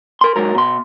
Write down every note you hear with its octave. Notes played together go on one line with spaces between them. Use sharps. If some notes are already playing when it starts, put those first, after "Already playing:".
A#4 C6
G#2 F#3 A#4
B2 C6